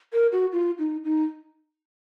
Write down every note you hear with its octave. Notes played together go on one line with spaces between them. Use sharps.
A#4
F#4
F4
D#4
D#4